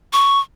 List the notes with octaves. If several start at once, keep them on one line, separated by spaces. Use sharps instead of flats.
C#6